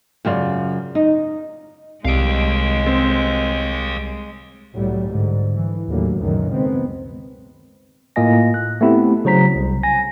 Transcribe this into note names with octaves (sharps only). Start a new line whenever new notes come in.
F#2 C#3 F4 D5
D#4
C2 G#3 D#5 F5 D7
C4
C2 A2 F#3 G3
G#2 D3
E3
D#2 A2 D3 E3 F#3 A#3
C#2 F#2 A#2 D#3 E3 F#3
B2 D#3 G#3 B3 C4
A2 A#3 F4 D#5 G#5 A#6
F#6
A3 B3 C4 E4 G4
C#3 F#3 C5 A#5 B6
C2
G#5 A#6